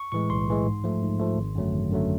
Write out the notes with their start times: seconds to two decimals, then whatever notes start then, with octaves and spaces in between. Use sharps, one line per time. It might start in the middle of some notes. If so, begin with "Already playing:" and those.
Already playing: C#6
0.12 A2 E3 G#3 C#6
0.30 B1 C6
0.48 A2 E3 G#3
0.66 G#2
0.84 F3 A3
1.02 G#2
1.20 F3 A3
1.38 G#1
1.55 F#2 D3 F#3 A3
1.73 G#1
1.91 F#2 D3 F#3 A3